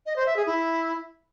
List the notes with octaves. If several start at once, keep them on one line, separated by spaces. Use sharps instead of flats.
D#5
C5
E5
G#4
E4